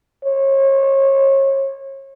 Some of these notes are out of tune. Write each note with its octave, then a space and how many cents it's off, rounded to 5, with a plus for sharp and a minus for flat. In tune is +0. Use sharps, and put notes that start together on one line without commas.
C#5 -35